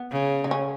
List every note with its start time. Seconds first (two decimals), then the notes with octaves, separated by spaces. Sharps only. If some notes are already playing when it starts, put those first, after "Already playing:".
Already playing: B3
0.11 C#3
0.44 D#4
0.51 C#4